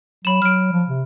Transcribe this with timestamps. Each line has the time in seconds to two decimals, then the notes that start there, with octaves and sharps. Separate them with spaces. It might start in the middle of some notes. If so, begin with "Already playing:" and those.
0.25 F#3 B5 E7
0.42 F#3 F6 D7
0.72 F3
0.88 C3